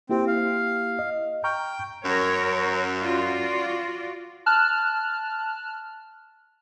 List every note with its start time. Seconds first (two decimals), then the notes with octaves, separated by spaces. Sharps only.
0.09 A#3 C4 E4 G4
0.27 F5
0.99 D#5
1.44 G5 A#5 C#6 F6 G6
2.05 F#2 A#4 C#5
3.00 F4 F#4 D5
4.46 A5 F6 F#6